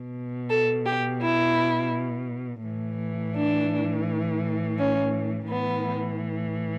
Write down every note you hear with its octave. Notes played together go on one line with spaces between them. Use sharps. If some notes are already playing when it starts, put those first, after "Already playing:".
Already playing: B2
A4
G4
E4
A2 E3
D4
C#4
A2 E3 B3